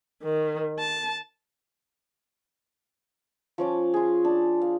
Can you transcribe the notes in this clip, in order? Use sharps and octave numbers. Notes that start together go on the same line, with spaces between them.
D#3
A5
F3 C#4 D6
F4 G#4
D4
F5